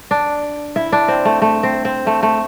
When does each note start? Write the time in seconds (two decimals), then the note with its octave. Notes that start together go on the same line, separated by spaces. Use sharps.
0.11 D4
0.76 E4
0.92 D4
1.08 C4
1.25 A3
1.42 A3
1.63 C4
1.85 C4
2.07 A3
2.23 A3